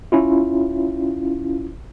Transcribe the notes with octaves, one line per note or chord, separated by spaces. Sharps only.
C#4 E4 F4